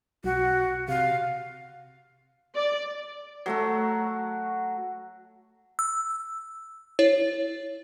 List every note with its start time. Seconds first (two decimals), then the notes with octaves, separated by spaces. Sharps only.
0.24 B1 F#4
0.88 C3 F5
2.55 D5
3.46 F#3 A3 F#4
5.79 E6
6.99 E4 C#5